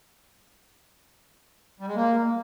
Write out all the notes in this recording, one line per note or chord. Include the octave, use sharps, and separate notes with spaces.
G3
G#3
A#3